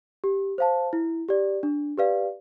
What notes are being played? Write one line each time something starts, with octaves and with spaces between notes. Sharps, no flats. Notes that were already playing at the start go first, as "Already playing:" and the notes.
G4
C5 F5 A5
E4
G4 D5
D4
G4 B4 D5 F5